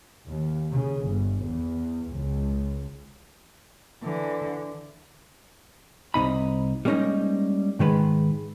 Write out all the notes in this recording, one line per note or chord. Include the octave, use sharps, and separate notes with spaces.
D#2
C#3
G1
E2
C#2
D3 E3
C2 C3 D#4 B5
G3 G#3 A#3 C#4 D#4 D#5
G#2 D#3 G#3 B4